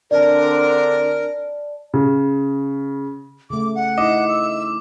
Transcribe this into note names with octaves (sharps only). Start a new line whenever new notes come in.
D3 C4 D4 A#4 D5 A5
C#3
C#3 A3 D6
F#5
D#4 E4 D#5 D6
E6